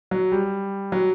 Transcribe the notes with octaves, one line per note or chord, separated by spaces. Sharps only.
F#3
G3
F#3